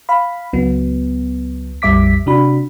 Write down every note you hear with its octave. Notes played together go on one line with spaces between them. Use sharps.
F5 B5
C#2 F#3 B3
A#1 F2 G3 E5 D6 B6
C3 D4 F#4 B5